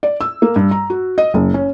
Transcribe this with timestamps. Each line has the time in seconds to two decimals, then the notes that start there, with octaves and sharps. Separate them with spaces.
0.03 D5
0.21 E6
0.42 A#3
0.56 G2
0.71 A#5
0.90 F#4
1.18 D#5
1.34 F#1
1.54 C#4